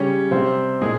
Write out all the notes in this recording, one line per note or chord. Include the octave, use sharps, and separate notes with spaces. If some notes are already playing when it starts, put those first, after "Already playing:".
Already playing: C#3 G3 C#4 C#5
C3 G3 C4 C5
A#2 G#3 G#4